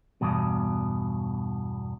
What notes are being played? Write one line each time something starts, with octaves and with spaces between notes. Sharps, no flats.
E2 G2 B2